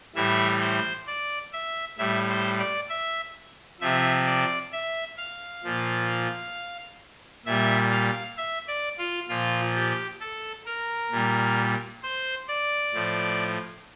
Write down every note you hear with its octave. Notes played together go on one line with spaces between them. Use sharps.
A2 E3 G3 E5
C5
D5
E5
A2 G3 E5
C5
D5
E5
C3 F3 E5
D5
E5
F5
A#2 F3
A#2 G3 E5
F5
E5
D5
F4
A#2 F3 F4
G4
A4
A#4
A#2 G3
C5
D5
A2 F3